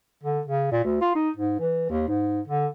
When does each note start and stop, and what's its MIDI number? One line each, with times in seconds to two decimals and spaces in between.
0.23 0.41 50
0.46 0.67 49
0.72 0.84 46
0.84 1.00 38
1.01 1.10 65
1.15 1.30 63
1.37 1.58 44
1.59 1.89 52
1.90 2.04 39
2.09 2.41 44
2.48 2.66 50